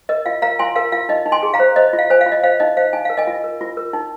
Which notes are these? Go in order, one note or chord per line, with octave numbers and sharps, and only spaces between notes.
A#4 D#5
F4 F5
A#4 F5 A#5
F4 G#5 C6
A#4 F5
F4 F5
D#4 D#5
D#4
G#5 C6
G#4
F5 A#5
C5
C5 D#5
F4
F5
C5 G#5
F5
F4
D#5
C5 F5
D#4 D#5
C5 F5
D#4 G#5
A#4 F5
D#5 G#5
F4
A#4
F4
A#4
D#4